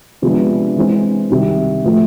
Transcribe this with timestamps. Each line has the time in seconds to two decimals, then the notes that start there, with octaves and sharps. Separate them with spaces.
0.22 C3 F3 G#3 B3 D4
0.76 E3 G#3 C4
1.30 C2 C3 D#3
1.84 A2 F3 A3